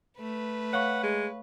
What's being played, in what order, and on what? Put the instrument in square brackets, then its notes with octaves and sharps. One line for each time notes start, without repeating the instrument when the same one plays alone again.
[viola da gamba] A3 [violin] B4
[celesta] C#5 F5 C#6 [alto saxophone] F#5
[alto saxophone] G#3